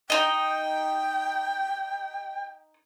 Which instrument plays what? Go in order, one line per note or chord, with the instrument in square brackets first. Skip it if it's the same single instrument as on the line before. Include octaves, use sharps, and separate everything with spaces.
[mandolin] D#4 D#5 [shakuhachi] G5